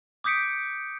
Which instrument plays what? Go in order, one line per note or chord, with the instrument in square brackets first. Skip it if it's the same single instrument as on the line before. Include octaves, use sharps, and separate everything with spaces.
[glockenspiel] D6 D#6 G6 B6 C#7 D7